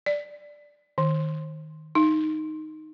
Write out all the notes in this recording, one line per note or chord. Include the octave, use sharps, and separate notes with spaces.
D5
D#3
D#4